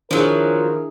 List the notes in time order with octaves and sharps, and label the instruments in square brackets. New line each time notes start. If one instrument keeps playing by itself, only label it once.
[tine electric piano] D#3 [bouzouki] F3 F#3 [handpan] D4 E4 G#4 [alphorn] A#4